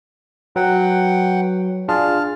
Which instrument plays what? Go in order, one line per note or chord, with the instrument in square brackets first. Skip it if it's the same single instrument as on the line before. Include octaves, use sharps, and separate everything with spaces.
[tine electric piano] F#3 [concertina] B4 F#5 G5
[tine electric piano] D4 F4 G#4 [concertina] A5 F6